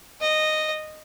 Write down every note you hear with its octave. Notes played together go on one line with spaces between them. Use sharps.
D#5